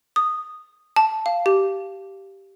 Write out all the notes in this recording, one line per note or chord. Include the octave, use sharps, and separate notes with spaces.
D#6
A5
F5
G4